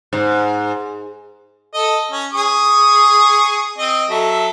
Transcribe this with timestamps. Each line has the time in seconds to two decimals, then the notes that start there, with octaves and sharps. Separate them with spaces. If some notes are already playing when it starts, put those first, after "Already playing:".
0.13 G#2
1.74 A4 D#5
2.11 C#4
2.33 G#4 C#6 D#6
3.78 C4 D#5
4.10 F#3 A4 E5